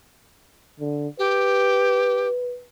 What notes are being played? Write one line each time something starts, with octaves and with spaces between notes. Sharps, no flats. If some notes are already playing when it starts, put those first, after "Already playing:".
D3
G4 B4